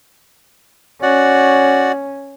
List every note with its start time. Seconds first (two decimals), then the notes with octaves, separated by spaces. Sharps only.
1.02 C#4 F#4 D5 F#5